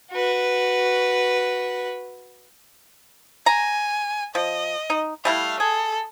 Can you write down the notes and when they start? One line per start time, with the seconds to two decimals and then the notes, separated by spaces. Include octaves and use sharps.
0.12 F#4 B4
3.46 G#5 A#5
4.35 F3 D#5
4.90 D#4
5.25 G3 A3 E4 F5
5.60 G#4 A4